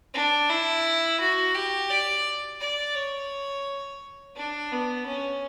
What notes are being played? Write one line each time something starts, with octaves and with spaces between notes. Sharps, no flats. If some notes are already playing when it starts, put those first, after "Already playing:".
D4
E4
F#4
G4
D5
D5
C#5
D4
B3
C#4